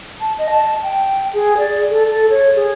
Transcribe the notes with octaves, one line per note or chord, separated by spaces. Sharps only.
A5
D#5
A5
G5
G#4
D5
A4
A4
C#5
G#4